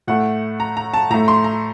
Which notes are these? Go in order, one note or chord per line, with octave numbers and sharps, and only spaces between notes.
A2 A3 F#5
A#5
A#5
A5
A2 A3 A#5
C6
A#5